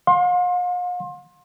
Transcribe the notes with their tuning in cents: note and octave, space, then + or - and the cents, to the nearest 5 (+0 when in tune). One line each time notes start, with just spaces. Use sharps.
F5 +45 C6 +25